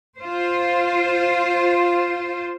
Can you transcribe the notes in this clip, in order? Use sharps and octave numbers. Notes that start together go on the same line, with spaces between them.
F4 C5